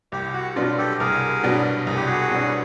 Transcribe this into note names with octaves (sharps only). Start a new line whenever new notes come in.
C2 G4
F#4
B2 F#3 B3 D4 F4
G4 A4
C2 G#4 A#4
B2 F#3 B3 D4
C2 G#4
G4
F#4 G#4
B2 F#3 B3 D4